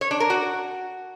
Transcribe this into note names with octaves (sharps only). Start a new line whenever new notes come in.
C#5
D4
A#4
F#4